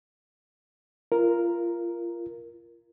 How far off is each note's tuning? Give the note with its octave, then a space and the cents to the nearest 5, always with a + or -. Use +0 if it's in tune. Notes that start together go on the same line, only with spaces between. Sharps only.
F4 -25 A#4 +0